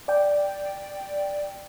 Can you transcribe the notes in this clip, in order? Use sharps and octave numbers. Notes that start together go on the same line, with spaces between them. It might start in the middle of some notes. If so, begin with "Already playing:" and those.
D5 G5